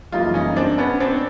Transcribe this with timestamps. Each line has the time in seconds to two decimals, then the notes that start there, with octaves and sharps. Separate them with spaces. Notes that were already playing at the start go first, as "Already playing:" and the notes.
0.12 F#2 C#3 E3 G3 A#3 D#4 F4
0.34 C#4 D#4
0.56 C4 D4
0.78 B3 C#4
1.00 C4 D4